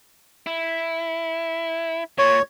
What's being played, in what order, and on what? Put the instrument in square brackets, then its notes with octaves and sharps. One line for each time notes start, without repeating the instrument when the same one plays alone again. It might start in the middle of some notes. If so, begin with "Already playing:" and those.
[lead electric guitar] E4
[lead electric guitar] A#2 [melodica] C#5